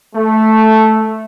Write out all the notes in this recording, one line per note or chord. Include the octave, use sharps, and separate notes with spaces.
A3